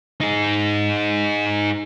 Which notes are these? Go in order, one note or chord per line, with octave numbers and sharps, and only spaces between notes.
D#4 G#4